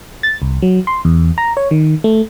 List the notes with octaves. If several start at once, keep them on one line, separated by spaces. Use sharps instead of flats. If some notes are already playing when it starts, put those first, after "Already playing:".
A6
C2
F#3
C6
E2
A#5
C#5
D#3
A3